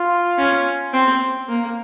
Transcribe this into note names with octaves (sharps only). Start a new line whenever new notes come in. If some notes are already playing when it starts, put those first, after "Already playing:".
Already playing: F4
C#4
C4
A#3